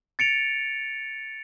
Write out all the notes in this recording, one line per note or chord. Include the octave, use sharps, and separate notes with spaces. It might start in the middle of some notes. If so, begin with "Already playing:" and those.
A6 C#7 D7 F7